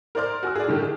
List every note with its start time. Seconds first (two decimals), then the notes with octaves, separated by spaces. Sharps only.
0.15 A#4 C5 D5 C6 F6
0.43 F#4 G#5 E6
0.55 G#4 D5
0.67 A2 D3 D#3 G4
0.82 G#4